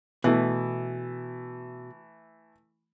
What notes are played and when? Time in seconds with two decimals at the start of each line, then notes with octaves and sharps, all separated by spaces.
0.24 B2 E3 A3